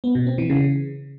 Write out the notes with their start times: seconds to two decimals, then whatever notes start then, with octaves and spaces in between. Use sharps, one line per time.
0.04 B3
0.15 B2
0.27 C4
0.38 E3
0.50 C#3